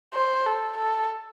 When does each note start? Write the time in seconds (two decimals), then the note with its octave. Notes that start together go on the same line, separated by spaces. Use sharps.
0.14 C5
0.46 A4
0.77 A4